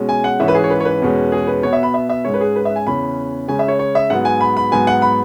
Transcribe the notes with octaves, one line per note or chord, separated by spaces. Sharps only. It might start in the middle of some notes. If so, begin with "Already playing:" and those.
Already playing: B2 G#3 C#4
G#5
F#5
G#2 E3 C#4 E5
B4
G#4
C#5
B4
C#5
B4
E2 B2 G#3 C#4
G#4
B4
B2 B3 C#5
E5
B5
E5
E5
G#2 G#3 C#4 C#5
B4
G#4
B4
E5
G#5
E2 C#3 E3 C#4 B5
C#3 G#3 C#4 G#5
E5
C#5
C#5
E5
G#2 F#3 B3 F#5
G#5
B5
B5
G#2 F#3 B3 G#5
F#5
B5